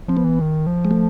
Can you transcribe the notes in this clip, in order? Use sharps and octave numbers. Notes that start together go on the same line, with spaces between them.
F3 C4
B3
E3
D#3
F3
G#3
A3